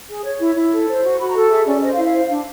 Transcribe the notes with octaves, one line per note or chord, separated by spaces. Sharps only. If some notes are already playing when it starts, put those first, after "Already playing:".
G#4
C#5
E4
E4
A4
C5
F#4
F#4 B5
A#5
A4
G#4 E5
C#4 D5
C5 D#5
F5
E4
F5
C5
D4